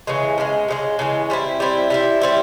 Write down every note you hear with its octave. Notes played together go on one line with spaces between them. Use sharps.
C#3 E3 G#3
C#3 E3 G#3
C#3 E3 G#3
C#3 E3 G#3
G3 C4 E4
G3 C4 E4
G3 C4 E4
G3 C4 E4